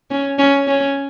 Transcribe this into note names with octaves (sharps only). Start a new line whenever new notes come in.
C#4
C#4
C#4